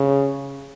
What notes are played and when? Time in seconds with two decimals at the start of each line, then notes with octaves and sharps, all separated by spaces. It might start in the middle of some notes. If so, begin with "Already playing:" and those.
Already playing: C#3